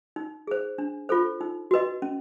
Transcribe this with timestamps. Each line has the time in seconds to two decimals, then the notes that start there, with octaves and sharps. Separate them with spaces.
0.16 D#4
0.47 G#4 C5
0.78 D4
1.09 F4 A4 C5
1.41 D#4
1.71 F#4 B4 D#5
2.02 C#4